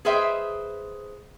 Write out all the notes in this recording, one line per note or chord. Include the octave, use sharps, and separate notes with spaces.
G#4 B4 C5 D#5 E5 G5